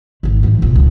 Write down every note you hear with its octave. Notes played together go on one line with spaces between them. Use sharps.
G#1 D#3
A1 E3
C#2 B2
D1 C#2